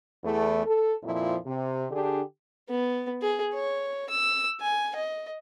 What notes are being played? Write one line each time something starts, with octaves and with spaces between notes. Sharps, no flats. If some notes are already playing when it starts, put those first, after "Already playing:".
E2 A3
A4
F2 A#2 F3 E4
C3
D3 D4 G4 G#4
B3
G#4
C#5
E6
G#5
D#5